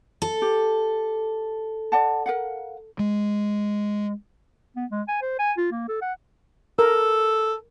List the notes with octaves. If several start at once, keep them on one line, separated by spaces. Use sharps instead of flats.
A4
G4
D5 F#5 A5
A#4 F5 F#5
G#3
B3
G#3
G#5
C5
G#5
F4
A#3
A4
F#5
A4 A#4